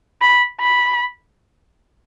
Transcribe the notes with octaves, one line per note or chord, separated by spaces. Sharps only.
B5
B5